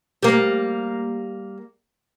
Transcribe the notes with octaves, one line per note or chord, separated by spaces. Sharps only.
G3 A#3